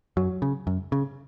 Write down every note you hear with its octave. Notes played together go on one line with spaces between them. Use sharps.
F#2 F#3
C#3
F#2
C#3